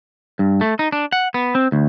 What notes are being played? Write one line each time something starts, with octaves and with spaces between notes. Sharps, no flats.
G2
A3
D#4
D4
F#5
B3
C4
D2